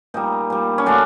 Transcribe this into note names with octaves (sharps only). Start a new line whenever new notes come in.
A#2 G3 D#4
A#2 G3
C#4
D3 F#3 A3 D4